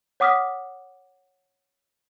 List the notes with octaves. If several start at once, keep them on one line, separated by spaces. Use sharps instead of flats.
C#5 F#5 D6 D#6 F6 B6